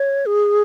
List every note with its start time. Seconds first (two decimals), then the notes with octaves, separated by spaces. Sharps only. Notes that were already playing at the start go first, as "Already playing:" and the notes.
Already playing: C#5
0.26 G#4